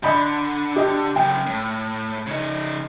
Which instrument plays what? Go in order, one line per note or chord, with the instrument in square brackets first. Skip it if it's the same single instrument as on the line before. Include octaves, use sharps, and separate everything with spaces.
[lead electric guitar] D3 [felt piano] D#5 B5 G6
[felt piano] G4 D#5 G6
[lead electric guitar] F#2 C#3 [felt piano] G5
[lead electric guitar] A2
C#3 D#4